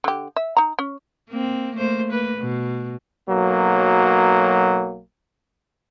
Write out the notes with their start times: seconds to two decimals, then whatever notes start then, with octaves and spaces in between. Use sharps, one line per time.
0.04 D3 G4
0.36 E5
0.57 D#4 A#5
0.79 C#4
1.29 A#3 C4
1.77 A3 A#3 C5
2.09 A#3 B4
2.39 B2
3.29 B1 F#3 A#3